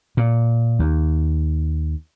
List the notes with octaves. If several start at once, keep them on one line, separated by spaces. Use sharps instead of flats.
A#2
D#2